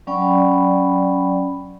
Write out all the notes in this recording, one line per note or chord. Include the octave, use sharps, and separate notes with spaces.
F#3 C#4 D5 G5 B5